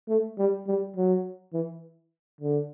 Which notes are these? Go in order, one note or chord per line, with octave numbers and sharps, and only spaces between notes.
A3
G3
G3
F#3
E3
D3